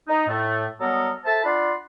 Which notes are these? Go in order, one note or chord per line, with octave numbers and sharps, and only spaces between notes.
D#4
A2 A3
F#3 G3 B3 A4 A#4 D#5
A4 C5 E5 A5
D4 F4 D5 F#5 B5 C6